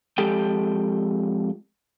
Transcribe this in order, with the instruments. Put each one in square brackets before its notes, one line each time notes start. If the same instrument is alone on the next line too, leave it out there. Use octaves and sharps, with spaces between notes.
[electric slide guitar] F2 G#3 G4 A4 G5